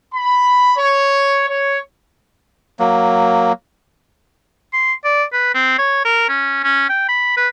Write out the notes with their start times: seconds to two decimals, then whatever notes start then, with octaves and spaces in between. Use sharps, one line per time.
0.12 B5
0.77 C#5
1.49 C#5
2.79 F#3 A#3
4.73 C6
5.04 D5
5.33 B4
5.55 C4
5.78 C#5
6.05 A#4
6.29 C#4
6.64 C#4
6.89 G5
7.09 B5
7.37 B4